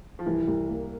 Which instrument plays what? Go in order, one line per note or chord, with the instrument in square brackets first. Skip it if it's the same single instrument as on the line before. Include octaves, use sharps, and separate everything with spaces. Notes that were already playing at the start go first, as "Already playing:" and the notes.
[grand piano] F3
[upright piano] C2 [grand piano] E3
[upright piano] C2
A#3